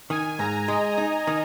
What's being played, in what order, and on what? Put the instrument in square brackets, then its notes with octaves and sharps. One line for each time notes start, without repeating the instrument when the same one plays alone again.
[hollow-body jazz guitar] D#3 [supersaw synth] G#5
[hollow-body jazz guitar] G#2 [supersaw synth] A#5
[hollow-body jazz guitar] G#3 [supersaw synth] D#5
[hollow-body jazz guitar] D#4
D#3